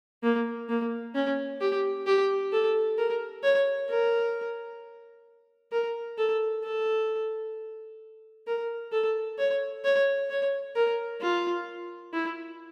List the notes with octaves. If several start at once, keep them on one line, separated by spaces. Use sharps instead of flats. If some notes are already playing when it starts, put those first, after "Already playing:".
A#3
A#3
C#4
G4
G4
A4
A#4
C#5
A#4
A#4
A4
A4
A#4
A4
C#5
C#5
C#5
A#4
F4
E4